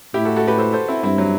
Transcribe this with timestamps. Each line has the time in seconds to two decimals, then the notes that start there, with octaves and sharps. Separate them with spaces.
0.14 A2 E4 G4
0.25 F#4 A4
0.36 F#4 A4
0.48 G4 B4
0.58 A4 C5
0.73 A4 C5
0.88 C4 E4
1.03 G2 C4 E4
1.18 F#3